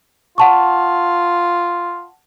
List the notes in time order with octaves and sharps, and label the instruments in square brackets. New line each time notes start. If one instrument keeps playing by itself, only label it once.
[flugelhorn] F4 [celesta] F#5 A5 C#6